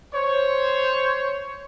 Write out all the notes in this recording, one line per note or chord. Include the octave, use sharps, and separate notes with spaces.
C5 C#5